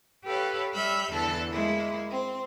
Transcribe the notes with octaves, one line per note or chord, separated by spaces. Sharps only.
G4 A4 B4 C#5 F5
G3 E5 B5 F6 G6
E2 D3 E3 A4 A5
G#3 A#3 E4
C4